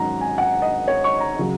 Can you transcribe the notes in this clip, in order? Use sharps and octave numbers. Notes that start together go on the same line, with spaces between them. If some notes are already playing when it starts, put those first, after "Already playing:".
Already playing: G#2 D#3 F#3 C#4 F#5 A#5
G#5
F#5
D#5
C#5
C#6
A#5
C#3 F#3